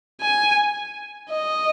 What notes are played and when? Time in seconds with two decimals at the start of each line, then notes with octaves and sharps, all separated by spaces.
0.21 G#5
1.30 D#5